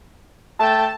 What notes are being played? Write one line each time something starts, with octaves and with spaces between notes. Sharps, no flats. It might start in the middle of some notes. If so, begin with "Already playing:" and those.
A3 G5 A5